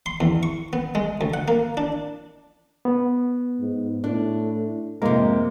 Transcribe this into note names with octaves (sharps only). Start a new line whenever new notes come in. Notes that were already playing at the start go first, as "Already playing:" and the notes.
C6
E2
C#6
B3
G#3
D2
F#5
A#3
D4
B3
G#2
A2 D4
F2 C3 G#3 A#3 A#4